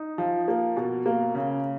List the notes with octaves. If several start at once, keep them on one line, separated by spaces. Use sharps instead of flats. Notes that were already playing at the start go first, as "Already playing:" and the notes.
Already playing: D#4
F3
A#3
B2
A#3
C#3